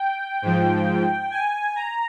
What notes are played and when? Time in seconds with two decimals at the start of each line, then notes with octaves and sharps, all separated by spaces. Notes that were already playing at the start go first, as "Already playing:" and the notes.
Already playing: G5
0.42 G#2 F3
1.31 G#5
1.76 A#5